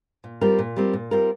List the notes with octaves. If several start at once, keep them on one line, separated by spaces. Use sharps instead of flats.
A#2
G3 C4 F4 A#4
A#2
G3 C4 F4 A#4
A#2
G3 C4 F4 A#4